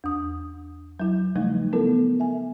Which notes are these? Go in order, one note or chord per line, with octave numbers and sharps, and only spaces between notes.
E2 D#6
F#3 E4
C#3 F3 G3 A3 D#4
B3 E4 A4 A#4
E5 G#5